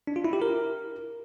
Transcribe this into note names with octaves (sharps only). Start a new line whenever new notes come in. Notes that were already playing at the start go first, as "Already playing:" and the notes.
D4
F4
E4
G4
A#4